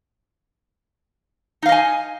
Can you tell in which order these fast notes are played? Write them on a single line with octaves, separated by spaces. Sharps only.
D#4 F5 D#5 G#5